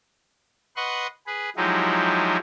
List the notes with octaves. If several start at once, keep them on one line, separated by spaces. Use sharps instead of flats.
B4 D#5 F#5 C6 C#6
G#4 B4
F3 F#3 G#3 D#4 E4 G4